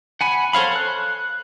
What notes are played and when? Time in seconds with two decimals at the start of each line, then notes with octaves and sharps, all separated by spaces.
0.21 F#5 G#5 B5
0.53 A4 C5 C#5 F5 B5
0.76 F#6